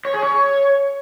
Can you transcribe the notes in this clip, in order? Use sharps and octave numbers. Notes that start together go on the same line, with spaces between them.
C#5
G#4
C#5